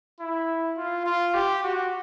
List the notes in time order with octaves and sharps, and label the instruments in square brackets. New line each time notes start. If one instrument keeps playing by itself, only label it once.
[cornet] E4
F4
F4
G4
F#4